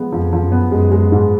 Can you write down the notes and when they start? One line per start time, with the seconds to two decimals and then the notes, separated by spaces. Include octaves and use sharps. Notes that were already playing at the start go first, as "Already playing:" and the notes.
Already playing: F3 G#3 B3
0.12 F2 F3
0.33 F3
0.42 F#2
0.52 B3
0.72 F#2 G#3
0.92 G#3
1.12 G#2